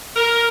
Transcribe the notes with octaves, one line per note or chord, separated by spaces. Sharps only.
A#4